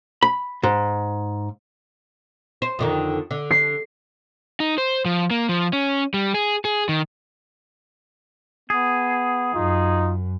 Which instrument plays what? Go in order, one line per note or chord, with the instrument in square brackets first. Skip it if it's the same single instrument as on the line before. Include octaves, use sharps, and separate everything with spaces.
[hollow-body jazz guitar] B5
G#2
[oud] C5
F2 D3 D#3
D3
[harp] C7
[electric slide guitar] D#4
C5
F3
A#3
F3
C#4
G3
G#4
G#4
D#3
[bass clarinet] B3 [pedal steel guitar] G#4
[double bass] F#2 [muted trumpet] D#4 [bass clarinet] F4